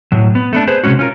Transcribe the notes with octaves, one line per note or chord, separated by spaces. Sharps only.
A2 F#3
B3
A3 B3 D4
G#4 B4 C5
C3 E3 G#3 C#4 F#4
C#4 F4 A#4